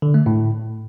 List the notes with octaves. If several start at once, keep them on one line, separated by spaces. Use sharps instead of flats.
D3
A3
A2